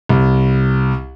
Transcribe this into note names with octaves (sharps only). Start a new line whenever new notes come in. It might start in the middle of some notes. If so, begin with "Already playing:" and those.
C2